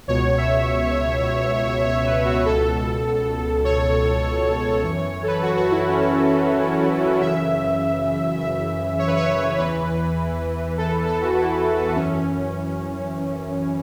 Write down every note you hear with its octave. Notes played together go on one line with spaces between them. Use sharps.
C#2 B2 C#5
E5
C#5
B4
F#4
C#2 B2 A4
C#5
F#2 E3 C#5
C#5
C#5
A4
B4
F#4
F#4
E4
C#4
F#2 C#3 E3 E5
E5
C#5
B4
C#5
E2 E3 B4
A4
A4
F#4
E4
F#2 E3 C#4